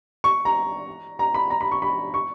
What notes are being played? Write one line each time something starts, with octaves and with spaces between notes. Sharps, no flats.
C#6
A#5
A#5
B5
A#5
B5
C#6
B5
C#6